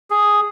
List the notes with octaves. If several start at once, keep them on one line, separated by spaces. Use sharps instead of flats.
G#4